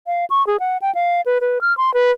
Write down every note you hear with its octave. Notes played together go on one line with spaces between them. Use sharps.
F5
C#6
G#4
F#5
G5
F5
B4
B4
F6
C6
B4